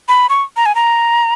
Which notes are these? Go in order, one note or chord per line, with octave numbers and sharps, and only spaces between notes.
B5
C#6
A#5
G#5
A#5